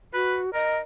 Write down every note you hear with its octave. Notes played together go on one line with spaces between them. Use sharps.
F#4 B4
A#4 D#5